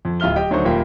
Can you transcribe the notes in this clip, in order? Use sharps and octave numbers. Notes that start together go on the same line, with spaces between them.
F2
D1 F4 E5 F6 G7
G4 D#5 G5
D2 F#3 D4 D#4 C5 C#6
D#1 A#2 A#3 G5